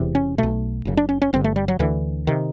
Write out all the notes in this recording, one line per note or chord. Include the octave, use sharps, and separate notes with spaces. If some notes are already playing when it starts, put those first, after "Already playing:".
Already playing: E1 E2 C3
C#4
B1 B2 A3
F#1 F#2 C#3
D4
C#4
C#4
G1 G2 D3 C4
A3
G3
F#3
D2 D3 E3
C3 D#3